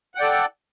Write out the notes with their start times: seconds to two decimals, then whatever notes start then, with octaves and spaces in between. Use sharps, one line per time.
0.15 F#5
0.17 G5
0.20 D5
0.23 A4